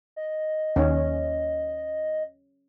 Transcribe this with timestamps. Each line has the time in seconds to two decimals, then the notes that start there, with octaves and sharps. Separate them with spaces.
0.16 D#5
0.76 D#2 C#4